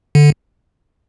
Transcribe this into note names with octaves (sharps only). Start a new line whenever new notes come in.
D3